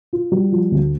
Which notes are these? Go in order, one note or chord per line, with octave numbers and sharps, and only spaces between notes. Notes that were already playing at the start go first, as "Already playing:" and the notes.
F4
G3
F3
D2